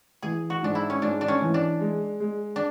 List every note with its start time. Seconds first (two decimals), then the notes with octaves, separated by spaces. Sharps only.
0.22 E3 G#4
0.50 F#4
0.63 G#2 D4
0.75 E4
0.90 C#4
1.02 G#2 D4
1.21 D4
1.28 C#4
1.42 E3
1.54 D4
1.80 G#3
2.20 G#3
2.56 D4